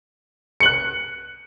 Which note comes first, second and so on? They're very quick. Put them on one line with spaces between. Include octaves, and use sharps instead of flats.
C#7 F#7 F#6